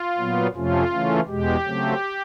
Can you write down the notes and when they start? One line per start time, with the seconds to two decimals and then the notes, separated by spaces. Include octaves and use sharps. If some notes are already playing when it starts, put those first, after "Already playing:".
Already playing: F4
0.18 A#2 F#3 B3
0.54 F2 C3 F3 A3 C#4 F4
0.91 C#3 E3 A3 C#4
1.28 E2 B2 G#3 G4
1.64 C#3 F#3 A3 C4